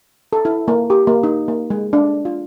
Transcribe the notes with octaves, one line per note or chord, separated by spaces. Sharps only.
A4
E4
A#3
G4
A#3
D#4
A#3
G#3
D4
F4